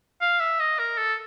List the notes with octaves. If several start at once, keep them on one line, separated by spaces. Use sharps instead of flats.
F5
E5
D#5
A#4
A4